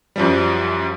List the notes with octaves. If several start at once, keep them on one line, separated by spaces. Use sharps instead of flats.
F#2 F3 G3